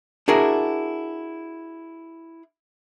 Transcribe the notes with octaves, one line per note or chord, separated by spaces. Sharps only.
D4 E4 F#4 G#4 A#4